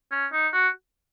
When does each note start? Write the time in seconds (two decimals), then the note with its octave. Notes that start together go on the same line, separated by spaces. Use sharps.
0.12 C#4
0.33 D#4
0.53 F#4